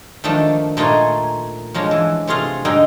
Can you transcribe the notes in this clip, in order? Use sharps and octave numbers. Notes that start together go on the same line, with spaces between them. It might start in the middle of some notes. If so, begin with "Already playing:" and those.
D#3 F3 A3 D4
A#2 A3 D#4 F4 C5 G#5
F3 G#3 C#4 D4
E3
C3 A3 F4 G#4 F5
D3 G#3 D#4 F5 G5